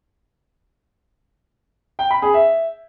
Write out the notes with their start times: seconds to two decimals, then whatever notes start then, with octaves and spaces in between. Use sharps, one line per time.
1.99 G5
2.11 B5
2.22 G#4
2.34 E5